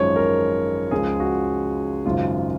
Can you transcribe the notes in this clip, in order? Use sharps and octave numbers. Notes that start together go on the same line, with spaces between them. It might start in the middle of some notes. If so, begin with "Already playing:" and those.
Already playing: G#1 F#2 F3 G#3 C#5
A#4
C#2 C#3 F3 G#3 G#4
F#4
G#1 F#2 C#3 G#3 F4